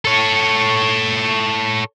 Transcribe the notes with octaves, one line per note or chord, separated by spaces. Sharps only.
A4 C#5